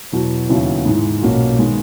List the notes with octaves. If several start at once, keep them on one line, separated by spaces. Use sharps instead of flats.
E2 B2 F#3
D#2 C#3 F#3 B3 E4
G#2 E3 G#3
B1 A#2 A#3 C#4 F#4
D#3 G#3 B3